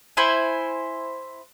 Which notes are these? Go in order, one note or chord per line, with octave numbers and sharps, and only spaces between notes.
E4 C5 G#5